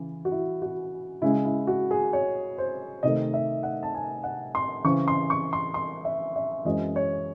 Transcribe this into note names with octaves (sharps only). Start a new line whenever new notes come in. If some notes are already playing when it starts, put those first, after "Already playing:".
Already playing: C#3 E3
F#4
E4
F#4
C#3 G#3 C#4 E4
E4
F#4
G#4
C#5
C5
C3 D#3 A3 D#5
E5
F#5
A5
G#5
F#5
C6
C#3 E3 C4 C#6
C6
C#6
C6
C6
E5
E5
F#2 E3 G#3 C4 D#5
C#5